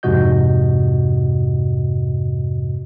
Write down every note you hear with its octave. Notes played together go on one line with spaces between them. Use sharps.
F2 G#2 C3 F#4 D#5 G6